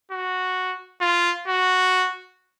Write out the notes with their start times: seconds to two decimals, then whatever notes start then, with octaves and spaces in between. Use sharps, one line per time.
0.11 F#4
1.01 F4
1.48 F#4